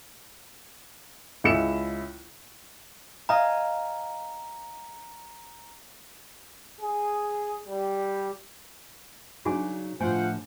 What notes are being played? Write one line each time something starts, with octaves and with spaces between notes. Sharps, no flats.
C#2 G#3 E4 C#7 E7
D#5 F5 G#5 A#5
G#4
G3
C#3 F#3 D4 D#4 F#4 G#4 G#5
A2 D3 F3 A3 F4 C5 F#5 G#5